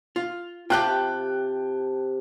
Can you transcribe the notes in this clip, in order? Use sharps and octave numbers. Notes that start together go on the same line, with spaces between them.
F4
C3 F4 G4 G5 A5 F#6